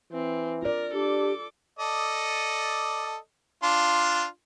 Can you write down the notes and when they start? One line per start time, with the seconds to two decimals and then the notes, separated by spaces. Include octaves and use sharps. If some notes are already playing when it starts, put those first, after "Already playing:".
0.12 E3 C4
0.62 F4 A#4 D5
0.93 D4 G4 A4 D6
1.79 A4 D5 D#5
3.63 D4 F4 C6